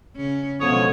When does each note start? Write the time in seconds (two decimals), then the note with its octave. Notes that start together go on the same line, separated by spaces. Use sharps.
0.16 C#3 C#4
0.60 F#2 B2 D3 F3 G#3 B3 C#5 D#6